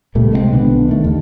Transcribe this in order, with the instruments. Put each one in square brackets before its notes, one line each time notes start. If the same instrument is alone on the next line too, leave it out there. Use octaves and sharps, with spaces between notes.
[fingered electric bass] C#2 A#2 G3 A3
C3 G#3 A#3 C4
B1 D3 B3 D4
D#3 A3
D#2